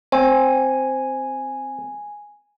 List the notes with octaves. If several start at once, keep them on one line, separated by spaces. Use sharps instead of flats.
C4 G#5